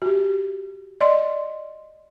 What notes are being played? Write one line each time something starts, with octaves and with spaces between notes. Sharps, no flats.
F#4 G4
D5 D#5 C6